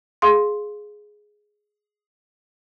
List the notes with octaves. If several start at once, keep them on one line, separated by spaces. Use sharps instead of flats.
G#4 F5 C6